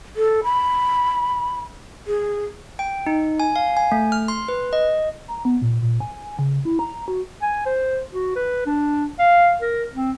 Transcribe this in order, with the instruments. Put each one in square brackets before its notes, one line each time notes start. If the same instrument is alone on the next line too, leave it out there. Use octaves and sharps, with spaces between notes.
[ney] A4
B5
G#4
[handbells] G5
D#4
G#5
F5
G#5
A3
F6
C6
B4
D#5
[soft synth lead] A#5
B3
A#2
A#2
G#5
C#3
E4
A#5
F#4
[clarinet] G#5
C5
F#4
B4
D4
F5
A#4
C4